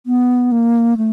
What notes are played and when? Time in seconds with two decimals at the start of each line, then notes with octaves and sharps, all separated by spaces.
0.06 B3
0.52 A#3
0.97 A3